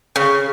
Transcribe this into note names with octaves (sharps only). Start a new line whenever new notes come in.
C#3